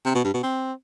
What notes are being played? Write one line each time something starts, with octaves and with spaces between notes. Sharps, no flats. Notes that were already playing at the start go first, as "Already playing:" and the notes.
C3
B2
G2
B2
C4